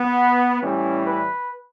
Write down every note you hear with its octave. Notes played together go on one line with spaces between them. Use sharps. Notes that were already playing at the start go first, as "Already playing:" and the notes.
Already playing: B3
A2 E3 G3 C#4
B4